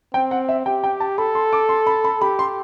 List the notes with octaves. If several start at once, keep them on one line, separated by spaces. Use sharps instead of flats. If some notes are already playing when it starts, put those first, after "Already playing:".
C4 G5
F#5
E5
G4 G5
G5
A5
A4 B5
C6
D6
C6
B5
B5
G4 B5
C6